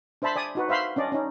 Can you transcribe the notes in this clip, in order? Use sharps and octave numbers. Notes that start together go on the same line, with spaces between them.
D4 C5 E5 A5 B5 C6
D5 G#5 D#6
D#4 F#4 B4
C5 E5 F5 B5 C6
C#4 D4 D5 D#5
C#4 D#4